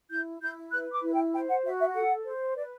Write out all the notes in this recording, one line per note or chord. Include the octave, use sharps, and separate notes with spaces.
E4 G6
E4 G6
B4 F#6
D6
E4
G5
C5 G5
F#5
F#4 E5
E5
A4 F#5
C5
B4 D5